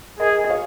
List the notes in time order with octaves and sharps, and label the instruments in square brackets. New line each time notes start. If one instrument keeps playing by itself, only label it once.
[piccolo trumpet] G#4 [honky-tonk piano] A#4 D#5
[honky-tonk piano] D#5
C#5 F5